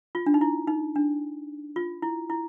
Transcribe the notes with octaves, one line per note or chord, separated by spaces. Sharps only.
F4
D4
D#4
E4
D#4
D4
F4
E4
E4